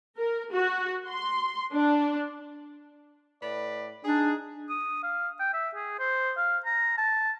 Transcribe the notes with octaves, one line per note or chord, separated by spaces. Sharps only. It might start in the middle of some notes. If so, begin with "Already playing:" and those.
A#4
F#4
C6
D4
A2 B4 D5
D4 D#4 G#4
D#6
F5
G5
E5
G#4
C5
F5
A#5
A5